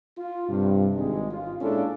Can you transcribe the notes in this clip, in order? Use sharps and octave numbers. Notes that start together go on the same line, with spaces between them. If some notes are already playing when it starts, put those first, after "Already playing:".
F4
G2 C3
G#1 G#3
F4
A#2 G#3 C#4 D4 E4 A4